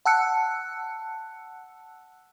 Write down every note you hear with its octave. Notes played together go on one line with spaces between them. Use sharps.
F#5 A5 E6 F#6 C#7